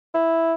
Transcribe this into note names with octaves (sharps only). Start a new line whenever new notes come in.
E4